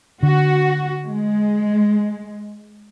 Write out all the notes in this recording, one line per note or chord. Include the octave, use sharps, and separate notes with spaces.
D3 F#4
G#3